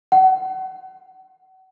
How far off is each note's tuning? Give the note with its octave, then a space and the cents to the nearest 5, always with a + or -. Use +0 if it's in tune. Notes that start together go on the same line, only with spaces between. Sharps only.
F#5 +30